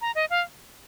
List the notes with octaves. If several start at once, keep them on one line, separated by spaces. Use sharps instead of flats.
A#5
D#5
F5